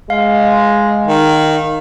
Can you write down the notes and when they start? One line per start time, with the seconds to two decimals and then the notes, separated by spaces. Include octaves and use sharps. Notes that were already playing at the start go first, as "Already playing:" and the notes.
0.10 G#3 F5
1.07 D#3